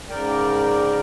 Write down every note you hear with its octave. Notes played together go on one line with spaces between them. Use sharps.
G#2 C#3 A#4 D5 G5